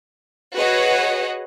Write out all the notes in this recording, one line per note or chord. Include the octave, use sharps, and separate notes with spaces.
F#4 G#4 B4 C#5 D#5 F#5